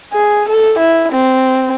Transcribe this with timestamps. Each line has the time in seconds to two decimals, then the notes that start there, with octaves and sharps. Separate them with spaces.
0.13 G#4
0.49 A4
0.79 E4
1.12 C4